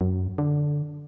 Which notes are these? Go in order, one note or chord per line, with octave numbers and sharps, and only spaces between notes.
F#2
D3